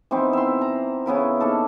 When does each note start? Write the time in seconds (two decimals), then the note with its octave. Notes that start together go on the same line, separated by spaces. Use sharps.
0.11 E3 B3 C4 D#4
0.33 E5 C6
0.61 A#5
1.06 C#3 B3 E4 A#4
1.40 A#3 D#4 A4